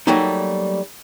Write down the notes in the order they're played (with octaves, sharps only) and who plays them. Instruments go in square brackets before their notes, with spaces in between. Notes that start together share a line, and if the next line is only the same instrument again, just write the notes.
[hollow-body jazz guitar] F#3 G3 A3 A#3 D#4